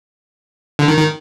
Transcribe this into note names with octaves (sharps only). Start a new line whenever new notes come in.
D3
D#3
D#3